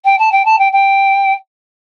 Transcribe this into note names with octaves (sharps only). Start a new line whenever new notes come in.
G5
A5
G5
A5
G5
G5